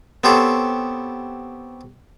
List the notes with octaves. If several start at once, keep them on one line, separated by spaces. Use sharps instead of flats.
B3 C4 G4 A4 C5 C#5